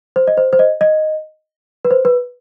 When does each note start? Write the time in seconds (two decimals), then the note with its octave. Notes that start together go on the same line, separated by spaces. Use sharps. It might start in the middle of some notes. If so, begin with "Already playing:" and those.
0.16 C5
0.27 D#5
0.37 C5
0.53 C5
0.59 D#5
0.81 D#5
1.85 B4
1.91 C5
2.05 B4